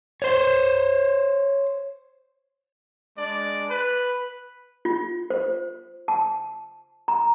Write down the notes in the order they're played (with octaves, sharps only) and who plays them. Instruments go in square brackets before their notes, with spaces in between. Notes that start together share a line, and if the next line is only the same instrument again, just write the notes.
[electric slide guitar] C5 C#5
[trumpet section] G#3 D4 D5
B4
[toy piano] F4
C5
A5
A#5